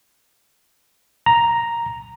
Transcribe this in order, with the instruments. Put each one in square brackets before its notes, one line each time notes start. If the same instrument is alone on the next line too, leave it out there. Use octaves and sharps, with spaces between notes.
[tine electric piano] A#5